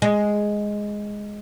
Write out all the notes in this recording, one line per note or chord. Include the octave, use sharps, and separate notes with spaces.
G#3